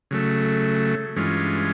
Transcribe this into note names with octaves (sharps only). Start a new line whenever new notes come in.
C#3 F#3 A3
G2 E3 G#3 C#4 F4